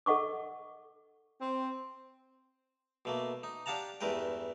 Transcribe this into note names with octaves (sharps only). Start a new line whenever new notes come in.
A4 D#5 F#5 C#6 D6
C4
B2 A3 A#3
D#4
D4 G4 F5 F#5 A5 A#5
E2 G2 A3 A#4 B4 G5